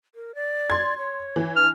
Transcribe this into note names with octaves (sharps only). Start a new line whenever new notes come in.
A#4
D5
C6 G#6
C#5
E3
D4 F6